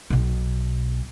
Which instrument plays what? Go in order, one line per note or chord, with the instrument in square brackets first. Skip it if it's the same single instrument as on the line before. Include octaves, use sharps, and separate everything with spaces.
[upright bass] B1 B2